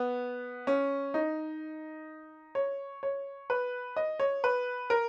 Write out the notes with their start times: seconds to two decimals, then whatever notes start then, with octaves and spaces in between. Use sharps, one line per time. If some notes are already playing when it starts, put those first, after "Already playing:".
Already playing: B3
0.67 C#4
1.14 D#4
2.55 C#5
3.03 C#5
3.50 B4
3.96 D#5
4.20 C#5
4.44 B4
4.90 A#4